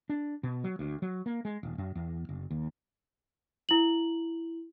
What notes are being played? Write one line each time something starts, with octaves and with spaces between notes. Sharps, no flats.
D4
B2
F#3
D2
F#3
A#3
G#3
D#1
F#2
E2
F#1
D#2
E4 F#7